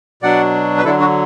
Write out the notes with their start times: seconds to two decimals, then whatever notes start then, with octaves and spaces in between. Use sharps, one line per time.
0.22 B2 F#3 D4 D5 F#5
0.78 B4
0.85 D3 F#3 D4 E4 A4
1.00 D4 F#4